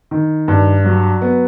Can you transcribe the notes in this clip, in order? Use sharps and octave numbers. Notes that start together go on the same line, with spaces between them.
D#3
G2
F#3
B3